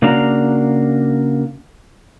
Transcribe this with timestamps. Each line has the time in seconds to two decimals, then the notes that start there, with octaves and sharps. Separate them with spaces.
0.02 C#3 A#3 D4 F#4 F5 A#5